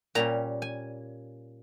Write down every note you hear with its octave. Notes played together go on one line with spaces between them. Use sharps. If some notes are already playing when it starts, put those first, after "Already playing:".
A#2 G3 C#4 A#5
G#5